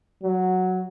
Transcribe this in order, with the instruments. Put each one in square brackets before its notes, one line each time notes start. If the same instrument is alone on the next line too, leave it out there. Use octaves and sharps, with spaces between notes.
[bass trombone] F#3